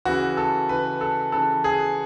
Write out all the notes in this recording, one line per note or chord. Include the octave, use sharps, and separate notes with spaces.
C#3 E3 F#4
A4
C#3 E3 B4
A4
C#3 E3 A4
G#4